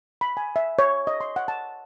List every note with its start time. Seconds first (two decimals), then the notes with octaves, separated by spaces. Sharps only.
0.21 B5
0.37 G#5
0.56 E5
0.79 C#5
1.07 D#5
1.21 C6
1.36 F#5
1.48 A5